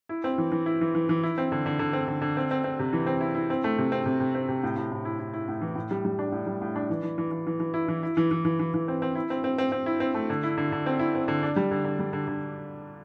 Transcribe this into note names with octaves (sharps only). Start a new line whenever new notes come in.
E4
C4
E3
E3
E4
E3
E3
E3
E4
C4
D3
D3
D3
C4
D3
D3
C4
C4
C4
C3
E3
C4
E4
E4
C4
A3
C3
C4
C3
C3
C4
C3
A2
A2
A2
E4
E4
E4
A2
E3
A2
G3
G3
D4
A2
G3
A2
D4
E3
E3
E3
E3
E3
E3
E4
E3
E4
E3
E3
E3
E3
E3
C4
C4
E4
C4
C4
C4
C4
E4
C4
A3
D3
E4
D3
D3
C4
E4
C4
D3
D4
G3
D3
D3
G3
D3
D3